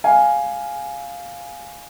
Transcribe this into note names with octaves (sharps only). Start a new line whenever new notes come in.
F5 G#5